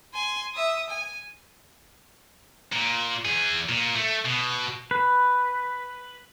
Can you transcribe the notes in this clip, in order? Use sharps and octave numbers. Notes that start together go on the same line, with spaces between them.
G#5 C6
E5 D#6
G#5
A#2
E2 G#4
A#2
A3
B2
B4